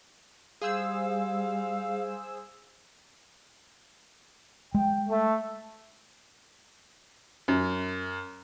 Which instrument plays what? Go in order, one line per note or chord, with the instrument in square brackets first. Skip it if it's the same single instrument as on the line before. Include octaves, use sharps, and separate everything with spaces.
[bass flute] G3 [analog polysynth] G#4 C5 E6 [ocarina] F5
[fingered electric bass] G#3 [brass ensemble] G5
[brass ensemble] A3
[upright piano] F#2